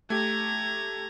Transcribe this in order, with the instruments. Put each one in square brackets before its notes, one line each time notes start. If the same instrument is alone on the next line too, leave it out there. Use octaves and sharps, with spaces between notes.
[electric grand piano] A3 G4 [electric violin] A#5 G#6